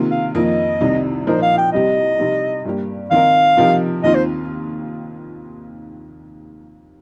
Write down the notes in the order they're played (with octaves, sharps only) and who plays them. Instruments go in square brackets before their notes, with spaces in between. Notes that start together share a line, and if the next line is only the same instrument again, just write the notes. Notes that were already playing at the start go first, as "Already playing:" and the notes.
Already playing: [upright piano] C3 D#3 A#3 F4
[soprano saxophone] F5
[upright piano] F2 D#3 A#3 D#4 [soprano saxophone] D#5
[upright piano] C2 C3 D#3
[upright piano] A#2 F3 D#4 A#4 [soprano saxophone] C5
[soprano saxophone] F5
G5
[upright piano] C2 C3 G3 C4 G4 [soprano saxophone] D#5
[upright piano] C3 G3 C4 D#4
G2 G3 A#3 G4
[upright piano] D#3 C4 D#4 A#4 [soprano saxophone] F5
[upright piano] C3 F3 D#4 G4 A#4
[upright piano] D#2 D#3 C4 F4 [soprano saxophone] D#5
[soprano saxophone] C5